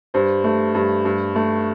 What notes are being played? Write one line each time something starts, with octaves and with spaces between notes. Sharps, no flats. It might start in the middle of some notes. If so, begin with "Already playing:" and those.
G2 C5
A3
G2
G2
A3